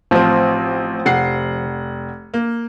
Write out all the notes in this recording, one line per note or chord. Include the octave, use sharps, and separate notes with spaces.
A1 F3 C4
F1 F#5 C7
A#3